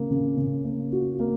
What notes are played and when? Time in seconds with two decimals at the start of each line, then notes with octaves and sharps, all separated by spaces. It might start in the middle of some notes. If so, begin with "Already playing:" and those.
Already playing: C#3 A#3
0.11 C#3
0.37 C#3
0.65 A#3
0.92 F#4
1.20 A#3